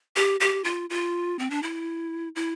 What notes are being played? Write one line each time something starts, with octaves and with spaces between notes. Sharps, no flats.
G4
G4
F4
F4
C4
D4
E4
E4